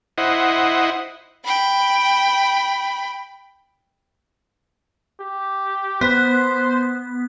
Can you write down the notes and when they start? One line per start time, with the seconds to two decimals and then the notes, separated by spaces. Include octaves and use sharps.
0.18 E4 C5 D#5 F#5
1.44 G5 B5
5.20 G4
6.01 B3 C5